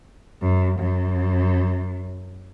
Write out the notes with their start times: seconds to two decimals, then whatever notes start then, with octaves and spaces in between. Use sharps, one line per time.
0.42 F#2
0.79 F#2